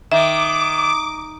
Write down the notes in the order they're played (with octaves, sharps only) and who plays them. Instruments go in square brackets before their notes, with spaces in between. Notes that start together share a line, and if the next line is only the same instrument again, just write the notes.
[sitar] D#3 [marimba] E5 [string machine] D6